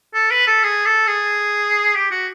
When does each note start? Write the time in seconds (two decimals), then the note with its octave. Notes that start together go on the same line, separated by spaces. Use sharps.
0.14 A4
0.31 B4
0.47 A4
0.64 G#4
0.85 A4
1.07 G#4
1.95 G4
2.11 F#4